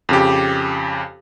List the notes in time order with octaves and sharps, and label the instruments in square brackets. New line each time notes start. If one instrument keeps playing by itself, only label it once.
[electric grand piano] F2 C#3 G4